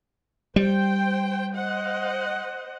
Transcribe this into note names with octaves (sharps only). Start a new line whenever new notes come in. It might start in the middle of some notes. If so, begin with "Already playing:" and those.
G3 C5 G5
C5 D#5 F#5